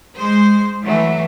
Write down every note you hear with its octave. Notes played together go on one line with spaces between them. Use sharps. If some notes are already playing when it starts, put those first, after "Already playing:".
G#3 C5
E3 F#3 A3